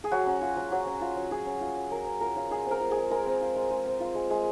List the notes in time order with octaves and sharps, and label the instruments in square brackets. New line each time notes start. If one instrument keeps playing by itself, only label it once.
[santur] G#4
F#3 F#4
C#4
F4
F#3
F#3
C#4
F4
F#3
F#3 G#4
C#4
F4
F#3
F#3 A#4
C#4
F4 A#4
F#3 F4
G#3 G#4
C4
A#4
F4
G#4
G#3
G#3 A#4
C4
F4
G#3
G#3
C4
F4
G#3
G#3